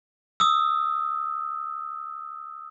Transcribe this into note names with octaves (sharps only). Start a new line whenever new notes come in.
D#6 E6